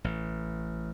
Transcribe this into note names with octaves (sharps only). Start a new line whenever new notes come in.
A1